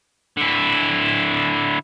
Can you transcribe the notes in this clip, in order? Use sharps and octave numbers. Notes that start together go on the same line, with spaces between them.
D3 E4